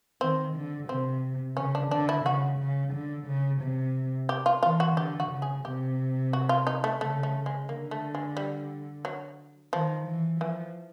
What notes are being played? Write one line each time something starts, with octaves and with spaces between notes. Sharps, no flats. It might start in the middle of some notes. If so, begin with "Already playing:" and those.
D#3 C4
D3
C3 C4
C#3 C#4
D4
D3 D4
E4
C#3 F#4
C#3
D3
C#3
C3
G4
F4
E3 F4
F#4
D3 G4
F#4
C#3
G#4
C3 G4
F#4
F4
D#4
A3
C#3 A3
A3
G#3
D3 A#3
A3
G#3
G3
F#3
D#3 F3
E3
E3 F3